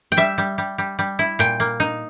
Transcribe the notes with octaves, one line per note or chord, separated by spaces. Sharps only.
G5
G3 E5
G3
G3
G3
G3
E4
A#2 G5
A#3
D#4